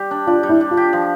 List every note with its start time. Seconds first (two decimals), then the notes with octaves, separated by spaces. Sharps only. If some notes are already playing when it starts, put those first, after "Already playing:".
Already playing: G3 G4
0.11 D4
0.27 D4 F4
0.43 G3
0.49 E4
0.61 D4
0.71 F4
0.77 G4
0.93 F3